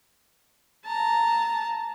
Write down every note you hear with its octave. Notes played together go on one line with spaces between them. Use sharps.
A5 A#5